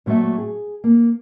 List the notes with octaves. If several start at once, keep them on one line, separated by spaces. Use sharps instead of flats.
A#2 F3 F#3 A3 E5
G#4
A#3